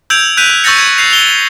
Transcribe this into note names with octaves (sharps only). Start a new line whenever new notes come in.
E6 G6 G#6 D7 F7
F#6 G6 B6 D#7 F7
C#6 E6 G6 A6 A#6 C#7
G#6
G6 C7 F7
F7 G7